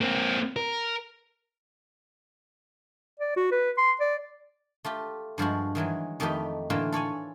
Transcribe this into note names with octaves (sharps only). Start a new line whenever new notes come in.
A#3 C4
A#4
D5
F#4
B4
C6
D5
A3 F4 G4
G2 F3 G#3 F#4
D#3 E3 F#3 G#3
F2 D#3 A3 D#4 G4 B4
A2 D3 E3 A#3 F4
A4 C#5 D5 G#5